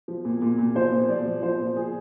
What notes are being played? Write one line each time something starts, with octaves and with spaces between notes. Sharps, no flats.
F3
A#2
A#2
A#2
F3 C5
A#2
F3 D5
F3
F3 C5
A#2
F3 G#4